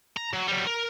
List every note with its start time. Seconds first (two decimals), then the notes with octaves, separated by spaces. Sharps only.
0.17 A#5
0.33 F#3
0.47 F#3 G3
0.66 A#4